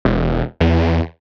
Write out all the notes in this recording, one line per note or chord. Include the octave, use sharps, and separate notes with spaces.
E1
E2